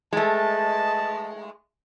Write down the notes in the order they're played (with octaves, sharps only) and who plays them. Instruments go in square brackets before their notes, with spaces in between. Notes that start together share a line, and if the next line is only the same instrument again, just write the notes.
[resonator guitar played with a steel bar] G#3 A3 [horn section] B4 D#5 A5